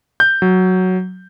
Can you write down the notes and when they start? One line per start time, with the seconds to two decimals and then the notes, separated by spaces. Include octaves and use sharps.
0.20 G6
0.42 F#3